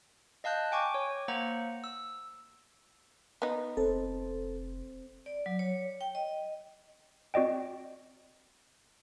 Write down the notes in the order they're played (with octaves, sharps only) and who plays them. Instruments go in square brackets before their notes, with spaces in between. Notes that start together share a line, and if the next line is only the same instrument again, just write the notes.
[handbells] D#5 F5 A5 F#6 G6
G5 G#5 C#6 D6
C#5
A#3 C5 F#5 A#5
E6
[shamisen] B3 D#4
[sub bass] F1 [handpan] C4 C5 [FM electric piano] A4
[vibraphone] D5
F#3
C#5
G5
D#5
[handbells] C4 F#4 D5 D#5 G5